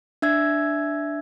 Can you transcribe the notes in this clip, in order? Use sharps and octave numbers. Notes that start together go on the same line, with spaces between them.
D4 E5 E6 G#6